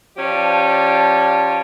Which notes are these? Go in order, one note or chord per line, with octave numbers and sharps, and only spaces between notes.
F3 C#4 G4 D5 A5